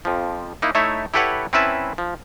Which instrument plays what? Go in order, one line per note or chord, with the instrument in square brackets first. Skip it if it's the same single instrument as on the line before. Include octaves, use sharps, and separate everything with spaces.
[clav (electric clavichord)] F2 F3
A#3 D#4 E4
A3 D#4 E4 C#5 E5
E4 G4 A4 B4 C#5 F#5
C4 C#4 E4 B4 E5 A5
F3